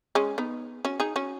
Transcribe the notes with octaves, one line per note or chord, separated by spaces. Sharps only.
G#3 C#4
B3 D#4
C#4 F#4
D#4 G#4
C#4 F#4